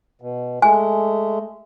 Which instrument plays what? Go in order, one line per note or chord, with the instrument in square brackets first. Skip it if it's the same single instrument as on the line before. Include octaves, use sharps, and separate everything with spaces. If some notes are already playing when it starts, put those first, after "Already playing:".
[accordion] B2
[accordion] G#3 A3 [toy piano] G#5